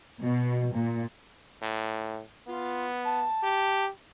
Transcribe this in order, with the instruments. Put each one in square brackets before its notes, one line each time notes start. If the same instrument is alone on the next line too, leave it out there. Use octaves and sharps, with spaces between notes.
[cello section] B2
A#2
[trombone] A2
[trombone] B3 [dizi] F4
[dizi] A5
[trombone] G4